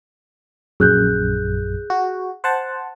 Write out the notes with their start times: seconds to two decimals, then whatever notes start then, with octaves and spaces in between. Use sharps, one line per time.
0.80 A#1 F#2 G#4 F#6 G6
1.90 F#4
2.44 C5 F#5 A5